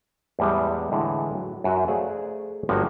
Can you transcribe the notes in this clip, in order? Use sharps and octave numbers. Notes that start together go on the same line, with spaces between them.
E2 A2 G3 G#3
A2 D3 E3 G#3
F#3
F#2 F#4 E5
A3 G#4 A4 C5 D5 F5
G1 G2 F3 A#3 F#4 F#5